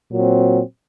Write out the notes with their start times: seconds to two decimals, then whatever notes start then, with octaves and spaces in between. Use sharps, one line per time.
0.11 A#2 F#3 C4